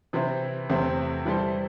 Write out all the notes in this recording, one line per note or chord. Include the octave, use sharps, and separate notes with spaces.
C3 E3 C4 E4
E2 C3 A3 C4
E3 G3 E4 A4 C5